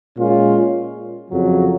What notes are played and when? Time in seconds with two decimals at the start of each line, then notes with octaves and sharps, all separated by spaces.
0.18 A#2 G#3 C#4 F4
1.30 F2 C#3 F#3